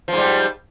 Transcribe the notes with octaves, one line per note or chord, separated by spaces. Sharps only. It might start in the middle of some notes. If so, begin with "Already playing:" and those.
G#2 F3 G3